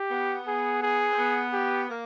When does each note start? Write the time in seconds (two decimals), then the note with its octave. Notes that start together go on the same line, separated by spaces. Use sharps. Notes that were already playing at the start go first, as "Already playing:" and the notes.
Already playing: G4
0.11 B3
0.47 G#4
0.82 G#4
1.12 C4
1.18 B3
1.53 G4
1.90 A#3